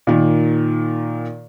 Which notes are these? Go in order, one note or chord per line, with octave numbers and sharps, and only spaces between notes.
A#2 D#3